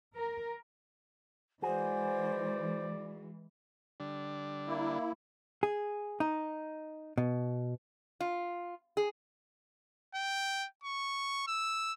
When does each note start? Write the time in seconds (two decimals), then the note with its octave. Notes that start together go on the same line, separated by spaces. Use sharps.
0.15 A#4
1.62 E3 G#3 F#4 G#4 C5 D5
4.00 D3 G3 D4
4.68 A#3 E4
5.63 G#4
6.20 D#4
7.18 B2
8.20 F4
8.97 G#4
10.15 G5
10.84 C#6
11.48 E6